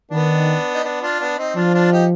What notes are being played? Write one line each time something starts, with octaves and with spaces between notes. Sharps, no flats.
D#3 B3 D4
D#4
B3 D4
D4 F4
B3 D4
C4 D#4
F3 D4 F4
D4 F4
D#4 G4